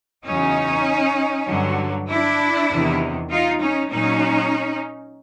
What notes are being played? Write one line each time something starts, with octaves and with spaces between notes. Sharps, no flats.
E2 C#3 F#3 C#4 D#4
G2 D3 F#3
D4 E4
E2 C3 D#3
D#4 F4
C#4 D#4
A#2 F#3 C#4 D#4